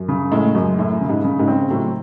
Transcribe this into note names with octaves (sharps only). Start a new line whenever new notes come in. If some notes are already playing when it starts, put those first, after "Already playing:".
Already playing: F#2
C#3
A2 G#3
F#2
A2 E4
C#3
G#2
C#3
G#2
C4
A2 F#3